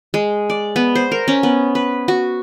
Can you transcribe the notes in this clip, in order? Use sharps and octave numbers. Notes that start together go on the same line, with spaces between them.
G#3
D5
B3
C5
A#4
C#4
B3
B4
F#4